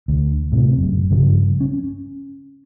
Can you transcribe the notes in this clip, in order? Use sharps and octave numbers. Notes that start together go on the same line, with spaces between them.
D2
A2 C3
F#1 F#2
G2 C#3 F3
C#4